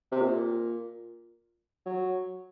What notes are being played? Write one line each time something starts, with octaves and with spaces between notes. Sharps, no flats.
C3
A#2
F#3